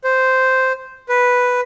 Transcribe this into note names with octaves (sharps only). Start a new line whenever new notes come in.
C5
B4